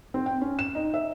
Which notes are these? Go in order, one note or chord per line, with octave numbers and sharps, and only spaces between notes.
C4
G5
C#4
E7
D#4
E5